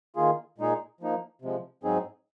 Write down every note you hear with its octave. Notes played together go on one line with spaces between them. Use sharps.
D#3 A#3 F4 G#4
A#2 G#3 D#4 G#4
F3 A#3 D#4
C3 F3 G#3
G#2 F#3 C4 D#4 G#4